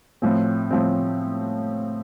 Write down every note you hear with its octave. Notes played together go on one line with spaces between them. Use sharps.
A2 F3 C4
A2 F3 C4